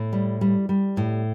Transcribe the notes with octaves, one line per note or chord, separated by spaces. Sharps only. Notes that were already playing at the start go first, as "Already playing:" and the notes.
Already playing: A2
G3
G3
G3
A2